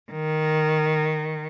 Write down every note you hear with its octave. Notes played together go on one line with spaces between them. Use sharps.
D#3